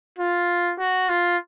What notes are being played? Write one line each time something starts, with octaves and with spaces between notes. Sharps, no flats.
F4
F#4
F4